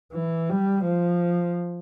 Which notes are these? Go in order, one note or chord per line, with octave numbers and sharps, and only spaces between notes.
E3
G3
F3